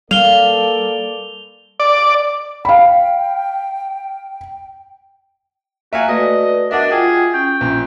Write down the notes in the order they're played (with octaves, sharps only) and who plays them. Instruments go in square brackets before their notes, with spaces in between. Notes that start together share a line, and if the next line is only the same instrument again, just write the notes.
[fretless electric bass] G3 [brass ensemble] A#3 A4 D5 [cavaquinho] F5 [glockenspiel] F7 G7
[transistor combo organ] D5
[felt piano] F5 B5 [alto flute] G5
[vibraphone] A#3 [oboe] F#4 [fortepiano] E5 F5 G#5
[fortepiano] A3 [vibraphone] F#4 B4 D5 [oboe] D#5
[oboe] D4 [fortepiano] F#4 E5 [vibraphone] A#4 D#5 F#5
[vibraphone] F4 G5 [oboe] G#4
[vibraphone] C#4 [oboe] G5
[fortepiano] A#1